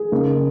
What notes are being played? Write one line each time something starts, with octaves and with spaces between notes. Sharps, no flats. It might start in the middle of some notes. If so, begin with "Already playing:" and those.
Already playing: G#4
C#3 A#3 D#4